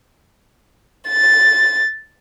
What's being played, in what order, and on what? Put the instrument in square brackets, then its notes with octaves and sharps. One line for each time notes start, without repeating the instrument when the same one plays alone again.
[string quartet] A6